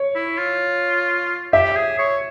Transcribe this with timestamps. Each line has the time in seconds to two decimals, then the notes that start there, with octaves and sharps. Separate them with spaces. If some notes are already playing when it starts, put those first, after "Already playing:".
Already playing: C#5
0.15 E4
0.39 F4
1.53 G4 E5
1.76 G#4
1.99 C#5